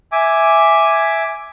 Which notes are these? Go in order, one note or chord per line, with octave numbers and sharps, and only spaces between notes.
E5 G#5 D6